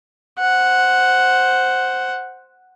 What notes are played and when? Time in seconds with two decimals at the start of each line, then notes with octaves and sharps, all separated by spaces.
0.39 C5 F#5